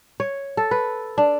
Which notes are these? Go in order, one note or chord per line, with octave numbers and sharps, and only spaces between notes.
C#5
A4
B4
D4